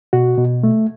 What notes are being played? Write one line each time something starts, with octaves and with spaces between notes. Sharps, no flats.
B2 F#4
B2
A3